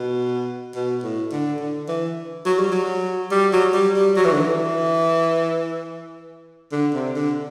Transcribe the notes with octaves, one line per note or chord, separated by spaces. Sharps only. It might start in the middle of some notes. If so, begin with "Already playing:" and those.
Already playing: B2
B2
A2
D3
D3
E3
F#3
G3
F#3
G3
F#3
G3
G3
F#3
E3
D3
E3
D3
C3
D3